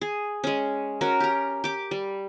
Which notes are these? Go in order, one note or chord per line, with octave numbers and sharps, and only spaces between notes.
G#4
G#3 C#4
C#4 F#4 A#4
G4 A#5
G4 D6
G3